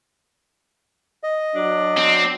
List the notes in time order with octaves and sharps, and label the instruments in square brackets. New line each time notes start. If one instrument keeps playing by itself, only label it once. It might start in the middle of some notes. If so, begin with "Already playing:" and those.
[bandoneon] D#5
[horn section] F#3 D4
[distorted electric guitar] C4